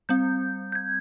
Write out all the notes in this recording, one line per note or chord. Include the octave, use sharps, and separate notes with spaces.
G3 C4 G6
G6
G#6